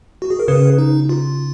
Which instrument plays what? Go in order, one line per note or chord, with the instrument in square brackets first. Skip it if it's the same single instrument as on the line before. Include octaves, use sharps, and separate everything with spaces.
[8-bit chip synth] F#4
G#4
A#4
[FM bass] C#3 [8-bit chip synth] G#4 B4
[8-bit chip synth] D#4
F4